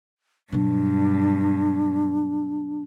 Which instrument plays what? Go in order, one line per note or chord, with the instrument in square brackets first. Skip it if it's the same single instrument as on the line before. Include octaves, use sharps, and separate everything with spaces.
[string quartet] G2 [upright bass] B2 F#3 [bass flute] D4